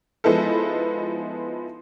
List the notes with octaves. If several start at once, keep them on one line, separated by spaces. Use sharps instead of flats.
F3 G#3 B3 D#4 E4 A4